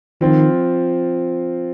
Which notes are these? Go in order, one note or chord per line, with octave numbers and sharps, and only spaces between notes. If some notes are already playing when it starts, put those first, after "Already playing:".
D#3 F3 C4 F4